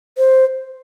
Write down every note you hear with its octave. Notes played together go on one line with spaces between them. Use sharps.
C5